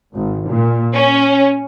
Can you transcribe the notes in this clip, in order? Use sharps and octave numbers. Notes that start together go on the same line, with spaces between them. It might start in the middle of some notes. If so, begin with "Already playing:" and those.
G#1
A#2
C#4